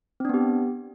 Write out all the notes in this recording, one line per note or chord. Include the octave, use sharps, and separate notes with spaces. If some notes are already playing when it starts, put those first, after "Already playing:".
B3 C4 D4 G4